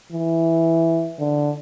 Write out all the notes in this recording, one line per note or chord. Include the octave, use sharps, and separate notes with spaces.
E3
D3